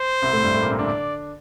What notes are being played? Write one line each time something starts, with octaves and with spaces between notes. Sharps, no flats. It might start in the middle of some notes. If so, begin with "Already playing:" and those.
Already playing: C5
C2 C3
A2 A3
G2 G3
A2 A3
A#2 A#3
C3 C4
D3 D4
D5